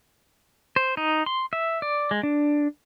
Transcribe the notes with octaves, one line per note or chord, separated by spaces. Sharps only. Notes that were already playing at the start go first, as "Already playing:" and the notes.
C5
D#4
C6
E5
D5
G#3
D4